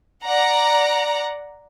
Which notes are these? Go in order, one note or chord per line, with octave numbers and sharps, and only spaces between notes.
D5 F#5 A#5